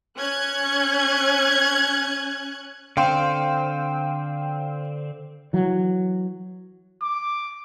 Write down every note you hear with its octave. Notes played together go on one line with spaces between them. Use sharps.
C#4 F#6 G#6
D3 C4 F5 G5 C6
E3 F#3
D6